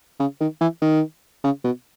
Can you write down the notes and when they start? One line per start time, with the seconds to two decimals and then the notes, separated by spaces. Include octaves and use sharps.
0.20 C#3
0.40 D#3
0.61 E3
0.82 D#3
1.44 C#3
1.64 B2